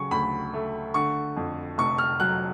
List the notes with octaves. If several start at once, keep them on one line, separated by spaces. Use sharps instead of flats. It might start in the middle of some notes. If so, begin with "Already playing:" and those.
Already playing: C#3 F#3 C#6
D2 B5
A3
D3 C#6
F2
F1 C#6
F6
F#3 F#6